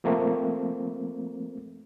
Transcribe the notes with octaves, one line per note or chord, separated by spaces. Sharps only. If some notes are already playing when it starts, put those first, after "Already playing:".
F3 A3 A#3 C4